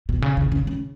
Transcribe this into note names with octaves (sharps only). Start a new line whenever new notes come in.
B2
C#3
C#3
C#3
C#3